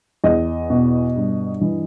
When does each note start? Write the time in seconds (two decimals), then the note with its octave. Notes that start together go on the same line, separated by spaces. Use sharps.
0.24 E2 D#5
0.70 B2
1.16 G2
1.61 E3